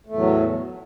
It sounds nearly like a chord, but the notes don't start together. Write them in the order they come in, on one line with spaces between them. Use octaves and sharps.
A3 E2 A2 F#3